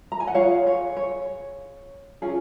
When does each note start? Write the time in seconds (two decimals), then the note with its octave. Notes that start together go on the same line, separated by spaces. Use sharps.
0.12 A#5
0.20 G#5
0.27 F#5
0.35 F4 G#4 C#5 F5
0.67 C#5
0.97 C#5
2.22 C#4 F4 G#4